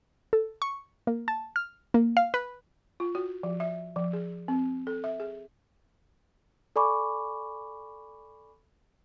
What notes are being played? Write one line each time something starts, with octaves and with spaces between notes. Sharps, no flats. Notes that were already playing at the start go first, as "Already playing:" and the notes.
A4
C#6
A#3
A5
F6
A#3
F5
B4
F4
F#4
F3
E5
F3
G#4
C4
A4
E5
G#4
A4 D5 G#5 B5 C#6 D6